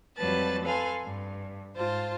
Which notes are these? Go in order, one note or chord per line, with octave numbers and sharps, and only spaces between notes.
F2 F#3 G3 B4 A5 A6
A4 B4 F5 G#5 C6
G2
G#2 F4 C5 A5